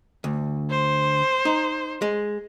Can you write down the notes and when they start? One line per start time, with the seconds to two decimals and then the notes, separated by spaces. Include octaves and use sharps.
0.24 D2
0.71 C5
1.45 D#4
2.02 G#3